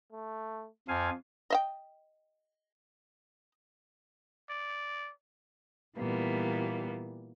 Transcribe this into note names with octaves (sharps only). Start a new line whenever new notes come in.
A3
F2 F3 F5 G#5
D#5 E5 G5
D5
A#2 E3 G3 A#3 B3